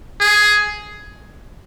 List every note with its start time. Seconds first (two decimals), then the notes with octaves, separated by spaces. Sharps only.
0.20 G#4